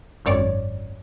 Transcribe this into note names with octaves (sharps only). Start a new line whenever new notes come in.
G#1 F#2 C#5 D5